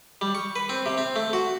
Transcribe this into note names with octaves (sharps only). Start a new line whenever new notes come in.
G3
C#6
B4
C4
C3
C4
A3
F#4